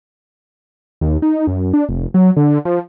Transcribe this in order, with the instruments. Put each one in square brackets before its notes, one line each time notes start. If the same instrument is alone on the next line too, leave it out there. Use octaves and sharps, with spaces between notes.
[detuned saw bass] D#2
D#4
F#2
D4
F1
F#3
D3
F3